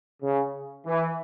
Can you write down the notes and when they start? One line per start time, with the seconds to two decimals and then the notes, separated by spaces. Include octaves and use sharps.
0.21 C#3
0.86 E3